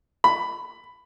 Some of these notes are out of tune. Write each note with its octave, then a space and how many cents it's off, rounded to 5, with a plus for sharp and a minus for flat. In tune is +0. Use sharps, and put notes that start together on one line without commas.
B5 +10